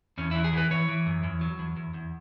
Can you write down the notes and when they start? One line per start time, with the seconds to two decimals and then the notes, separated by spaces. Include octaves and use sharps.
0.18 E2 C#4
0.31 E3 E4
0.44 G#4
0.53 E3 B4
0.71 E3 C#5
0.88 E3
1.06 F#2
1.23 E2
1.41 F#3
1.59 E2
1.77 E2
1.94 E2